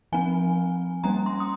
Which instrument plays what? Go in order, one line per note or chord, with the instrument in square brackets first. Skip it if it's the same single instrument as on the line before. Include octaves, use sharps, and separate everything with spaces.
[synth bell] F3 C4 G#5
G3 A#3 C#4 A#5
C6
D#6